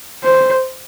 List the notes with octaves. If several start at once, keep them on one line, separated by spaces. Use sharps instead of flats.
C5